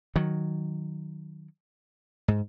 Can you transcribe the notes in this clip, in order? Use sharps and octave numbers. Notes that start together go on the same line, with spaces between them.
D#3 F#3
G#2